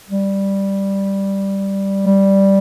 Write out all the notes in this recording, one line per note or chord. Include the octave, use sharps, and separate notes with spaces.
G3
G3